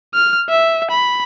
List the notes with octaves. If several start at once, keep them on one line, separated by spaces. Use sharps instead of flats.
F6
E5
B5